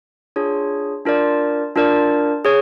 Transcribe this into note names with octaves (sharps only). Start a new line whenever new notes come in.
D4 F4 G#4 C#5
D4 F4 A#4 D5
D4 F4 A#4 D5
G#4 C#5